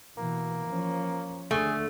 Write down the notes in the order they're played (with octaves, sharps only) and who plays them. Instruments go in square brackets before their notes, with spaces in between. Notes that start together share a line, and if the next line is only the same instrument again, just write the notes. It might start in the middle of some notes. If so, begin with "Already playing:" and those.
[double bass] B2 E3 [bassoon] A#3
[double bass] F3 C#4
[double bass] D#2 D3 [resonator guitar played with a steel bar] A3 [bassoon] G#4